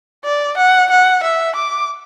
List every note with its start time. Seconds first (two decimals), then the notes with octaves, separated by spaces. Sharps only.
0.24 D5
0.57 F#5
0.90 F#5
1.23 E5
1.56 D6